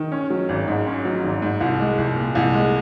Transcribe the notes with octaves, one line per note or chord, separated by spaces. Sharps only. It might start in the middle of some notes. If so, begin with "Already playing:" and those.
Already playing: D#3
C#4
F#3
G#1
G#2
C#4
F#3
G#1
G#2
C2
G#3
C2
A#2
C2
G#3